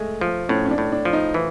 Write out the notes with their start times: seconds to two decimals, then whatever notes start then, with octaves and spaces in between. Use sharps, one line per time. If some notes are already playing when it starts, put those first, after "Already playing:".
Already playing: G#3 A3
0.21 F3
0.49 A2 C#4
0.65 C#4
0.71 D4
0.78 A2
0.92 D4
1.05 F3
1.13 D#4
1.34 E3